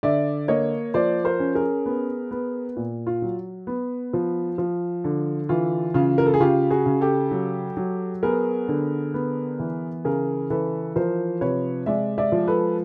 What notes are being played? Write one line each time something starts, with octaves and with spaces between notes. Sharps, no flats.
D3 D5 E5
A#3 C#5 D#5
F3 C5 D5
A#4 C5
C#4
G#4 A#4
B3
B3
A#2
F4
F#3
B3
F3
F3
D3
E3 F4
C#3 F4
A#4
A4
G#4
C#3 F4 G4
F#4 G#4
C#3
G4 A4
F#3
F#3
B3 G#4 A#4
D3
B3
E3
C#3 G#4 A#4
E3 A4 B4
F3 A#4 C5
C3 B4 C#5
G#3 D5 E5
D5 E5
F3
A4 B4